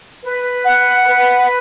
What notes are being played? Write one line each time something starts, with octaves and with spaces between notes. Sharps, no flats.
B4
F#5
B4